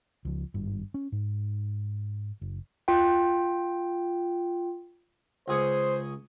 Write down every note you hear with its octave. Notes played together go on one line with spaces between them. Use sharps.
C#2 F3
G#1 G2
C#4
G#2
F#1
F4 G5
C#2 G#4 C5 C#6